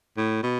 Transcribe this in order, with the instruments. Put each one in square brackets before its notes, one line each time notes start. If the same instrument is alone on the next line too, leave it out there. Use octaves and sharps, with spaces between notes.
[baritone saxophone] A2
B2